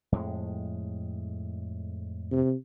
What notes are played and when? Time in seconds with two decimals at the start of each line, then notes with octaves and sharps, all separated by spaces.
0.12 F2 A2 G#3
2.32 C3